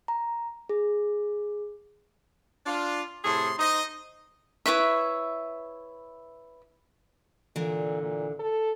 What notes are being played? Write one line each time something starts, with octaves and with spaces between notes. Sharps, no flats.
A#5
G#4
D4 F4
A2 C3 G#4 A4 C6
D#4 C5 D#5
E4 B4 C#5 E5
A#2 D3 E3
A#2
A4